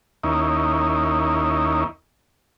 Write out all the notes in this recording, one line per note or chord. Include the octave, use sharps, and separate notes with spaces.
D#2 A#3 C#4 D#4 E4